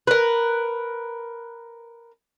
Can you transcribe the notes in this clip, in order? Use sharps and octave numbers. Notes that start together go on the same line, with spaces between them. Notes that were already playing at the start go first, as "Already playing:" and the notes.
A#4 B4